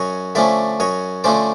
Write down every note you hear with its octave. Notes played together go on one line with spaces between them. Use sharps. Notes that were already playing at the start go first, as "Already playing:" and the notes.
Already playing: F#2 C#5 D#5
D3 F3 A3 C#4 D5 E5
F#2 C#5 D#5
D3 F3 A3 C#4 C5 D5